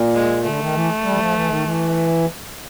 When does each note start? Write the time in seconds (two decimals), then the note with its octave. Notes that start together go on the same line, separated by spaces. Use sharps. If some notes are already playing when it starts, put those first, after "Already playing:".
Already playing: A#2
0.14 G#3
0.44 D3 A3
0.59 D#3
0.74 E3
1.04 G3
1.13 E3
1.19 F3
1.33 E3
1.48 D#3
1.63 E3